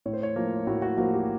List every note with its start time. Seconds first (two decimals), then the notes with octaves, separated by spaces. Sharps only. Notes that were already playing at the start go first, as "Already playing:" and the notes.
0.06 A2 C#5
0.14 C5
0.23 C#5
0.36 F3 A#3
0.67 A2 F#4
0.82 F#4
0.98 F3 A#3 F#4
1.13 G4